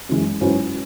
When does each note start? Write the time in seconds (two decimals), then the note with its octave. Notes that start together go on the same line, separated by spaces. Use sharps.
0.09 F#2 E3 G#3
0.41 G#2 F#3 C#4 E4 B4